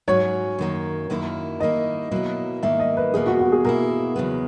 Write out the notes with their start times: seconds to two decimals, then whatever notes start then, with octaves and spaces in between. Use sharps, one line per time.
0.08 G#2 F#3 C#4 F#4 C#5
0.59 F#2 D#3 A#3
1.10 F#2 D#3 A#3 E4
1.60 D#3 A#3 E4 D#5
2.11 B2 F#3 A#3 E4
2.63 G#2 D#3 A#3 E5
2.79 D#5
2.97 B4
3.14 E2 B2 A#3 G#4
3.26 F#4
3.39 F#4
3.52 G#4
3.64 B2 A#3 E4 A#4
4.16 E2 C#3 F#3 B3